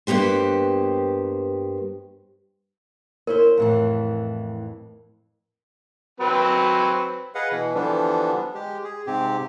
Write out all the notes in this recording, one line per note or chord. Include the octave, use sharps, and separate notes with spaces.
G2 A#3 B3 G4 C5
C#4 E4 A#4 C5
F2 A2 E3
F#3 C4 B4
G#4 B4 D#5 F5 F#5
B2 E3
D3 E3 F3 G3 B3 D4
G#3 G4
G#4
G#2 C3 C4 G4